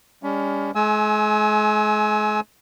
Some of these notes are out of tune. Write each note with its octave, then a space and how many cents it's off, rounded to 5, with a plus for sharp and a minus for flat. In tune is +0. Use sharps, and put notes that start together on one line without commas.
G3 +40 C#4 +35
G#3 +40 G#5 +20 E6 -25